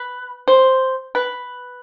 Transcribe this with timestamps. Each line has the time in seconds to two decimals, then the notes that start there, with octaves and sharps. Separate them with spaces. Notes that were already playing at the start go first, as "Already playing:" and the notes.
Already playing: B4
0.48 C5
1.15 B4